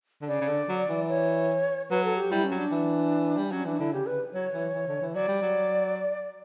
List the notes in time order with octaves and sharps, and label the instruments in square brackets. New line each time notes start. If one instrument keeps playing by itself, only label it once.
[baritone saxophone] D3
[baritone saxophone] C#3 [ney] D5
[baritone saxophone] C#3
D3
F#3
E3
[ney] C#5
[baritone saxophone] F#3 [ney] B4
[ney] A4
G4
[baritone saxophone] G3 [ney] E4
[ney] C#4
[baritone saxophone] F#3
[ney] D4
[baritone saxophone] E3
G3
[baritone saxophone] F#3 [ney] C#4
[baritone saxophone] E3 [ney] D4
[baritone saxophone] D3 [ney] E4
[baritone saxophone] C#3 [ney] G4
[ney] B4
[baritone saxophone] F#3 [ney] C#5
[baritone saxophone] E3
E3
D3
E3
[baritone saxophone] F#3 [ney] D5
[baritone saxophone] G3
F#3